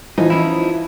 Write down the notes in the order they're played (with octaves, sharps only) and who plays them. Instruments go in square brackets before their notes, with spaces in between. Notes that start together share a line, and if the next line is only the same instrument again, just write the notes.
[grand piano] E3 [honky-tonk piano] F3 [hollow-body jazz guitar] D#4
[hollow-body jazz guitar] C#4 D#4 E4